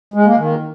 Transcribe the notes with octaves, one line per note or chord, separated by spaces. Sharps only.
G#3
A#3
D#3